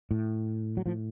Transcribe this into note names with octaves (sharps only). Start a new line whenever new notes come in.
A2
F#3
A2 F3